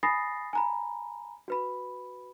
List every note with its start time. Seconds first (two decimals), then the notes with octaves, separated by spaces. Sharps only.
0.03 G#5 B5 D#6 A6 A#6 C7
0.53 G#5 A#5 B5
1.48 F#4 B4 B5